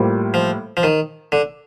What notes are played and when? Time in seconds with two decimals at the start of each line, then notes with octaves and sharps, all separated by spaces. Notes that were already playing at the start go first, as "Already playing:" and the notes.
Already playing: A2 G3 A#3 F4 C5
0.34 F3
0.77 F3
0.83 D#3
1.32 D3